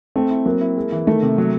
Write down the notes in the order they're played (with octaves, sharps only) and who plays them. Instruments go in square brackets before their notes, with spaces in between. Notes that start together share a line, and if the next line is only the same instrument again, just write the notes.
[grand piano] A3 [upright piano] C4
[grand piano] E4
[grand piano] F#3 [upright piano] A#3
[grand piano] E4
G#3
E3
[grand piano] D#3 [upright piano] A3
[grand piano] C3
F#3